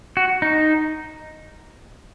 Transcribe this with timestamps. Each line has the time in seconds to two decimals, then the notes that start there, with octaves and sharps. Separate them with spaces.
0.17 F#4
0.42 D#4